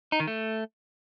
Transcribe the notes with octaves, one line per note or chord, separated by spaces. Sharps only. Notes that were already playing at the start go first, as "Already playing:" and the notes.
D#4
D#3
A3